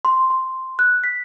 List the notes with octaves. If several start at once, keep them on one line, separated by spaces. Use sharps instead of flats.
C6
C6
F#6
B6